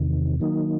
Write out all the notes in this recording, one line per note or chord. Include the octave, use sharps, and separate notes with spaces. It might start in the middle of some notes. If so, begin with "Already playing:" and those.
Already playing: E2 C3 D#3
D#3 F#3 A#3 D#4